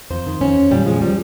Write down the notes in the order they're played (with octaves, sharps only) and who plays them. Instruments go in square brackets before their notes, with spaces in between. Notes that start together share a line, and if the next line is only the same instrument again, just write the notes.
[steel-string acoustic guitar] F2 C5
D#3
F2 C#4
F2
A#2 G3
F3 G#3
F3 G3